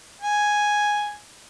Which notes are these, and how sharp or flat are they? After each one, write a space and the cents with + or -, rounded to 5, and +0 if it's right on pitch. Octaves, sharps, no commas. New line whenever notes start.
G#5 +0